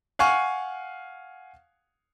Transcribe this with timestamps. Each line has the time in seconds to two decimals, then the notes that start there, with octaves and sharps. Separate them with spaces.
0.19 F5 F#5 G#5 C#6